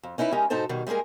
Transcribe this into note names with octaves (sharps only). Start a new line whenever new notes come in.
F2
C#4 D#4 E4 F#4 B4
G#3 C#4 D#4 G4 A#4
G#2 B2 D#4 A4 C5 A5
B2 D#3 G3
G3 G#3 A#3 G#4 A#4